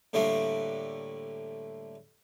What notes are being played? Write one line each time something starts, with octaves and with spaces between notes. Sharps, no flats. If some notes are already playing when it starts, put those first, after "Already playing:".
A2 D3 G3 A3 A#3 D4